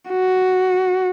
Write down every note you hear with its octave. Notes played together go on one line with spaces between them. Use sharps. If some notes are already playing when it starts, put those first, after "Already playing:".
F#4